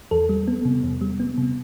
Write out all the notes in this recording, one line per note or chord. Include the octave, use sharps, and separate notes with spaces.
E2 A4
G3
B3
C3
E2
G3
B3
C3